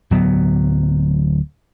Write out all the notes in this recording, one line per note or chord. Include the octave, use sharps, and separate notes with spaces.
D1 F#3 B3